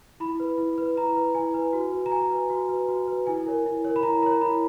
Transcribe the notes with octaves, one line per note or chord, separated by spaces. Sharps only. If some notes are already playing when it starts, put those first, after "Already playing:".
E4 B5
B4
E4
B4
E4 A#5
B4
E4 G#5
B4
F#4
B4
A#5
F#4 G#5
B4
F#4
B4
F#4
B4
E4 G#5
A#4 C#5
E4
A#4 C#5
B5
E4 A#5
A#4 C#5 A#5
E4 B5